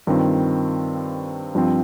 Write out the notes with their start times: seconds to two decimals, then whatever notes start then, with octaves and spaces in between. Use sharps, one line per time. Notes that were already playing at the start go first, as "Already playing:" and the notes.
0.07 G2 D#3 C4 F4
1.55 G2 F3 C4